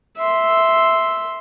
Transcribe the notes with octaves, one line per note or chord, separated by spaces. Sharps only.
E5 C6